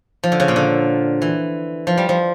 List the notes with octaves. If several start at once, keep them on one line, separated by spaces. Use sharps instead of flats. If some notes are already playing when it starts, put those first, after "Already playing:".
F3
D3
C#3
A#2
D3
E3
F3
G3
F3